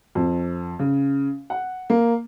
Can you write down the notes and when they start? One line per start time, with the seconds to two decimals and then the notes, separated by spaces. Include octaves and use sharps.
0.15 F2
0.79 C#3
1.50 F#5
1.90 A#3